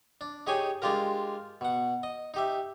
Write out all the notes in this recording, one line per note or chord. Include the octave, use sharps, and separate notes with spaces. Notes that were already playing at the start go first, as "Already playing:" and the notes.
D4
D#4 G4 G#4 C#5 G#5
G#3 D4 F4 G4 A#4
B2 F#5
D#5
D#4 G4 E5